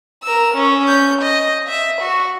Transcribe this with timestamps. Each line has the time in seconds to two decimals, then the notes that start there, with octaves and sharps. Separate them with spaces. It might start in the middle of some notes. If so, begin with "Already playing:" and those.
0.23 A#4 E6
0.55 C#4
0.87 G6
1.22 D#5
1.69 E5
2.01 F#4